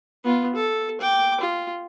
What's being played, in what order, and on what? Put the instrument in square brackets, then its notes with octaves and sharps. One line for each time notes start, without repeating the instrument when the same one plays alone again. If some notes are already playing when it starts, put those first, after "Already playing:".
[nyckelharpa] B3 F4
A4
G5 D6
F4